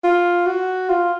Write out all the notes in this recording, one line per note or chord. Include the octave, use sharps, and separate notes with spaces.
F4
F#4
F4